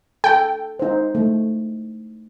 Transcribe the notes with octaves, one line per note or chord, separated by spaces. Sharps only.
A4 G5
D#4 C5
A3